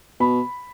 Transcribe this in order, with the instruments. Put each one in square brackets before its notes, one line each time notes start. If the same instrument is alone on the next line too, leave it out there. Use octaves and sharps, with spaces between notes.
[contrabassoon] B2 [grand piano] B5